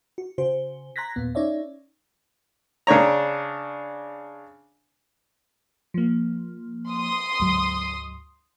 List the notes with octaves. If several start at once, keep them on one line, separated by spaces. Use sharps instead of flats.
F#4
C#3 F#4 C5
A#5 C6 F#6 G#6 A#6 B6
D#2 A#2 B3
C#4 D#4 C#5 D5 E5
C#3 D4 C#5 A#5
F3 A#3
C6 D#6
D2 G#2 F#3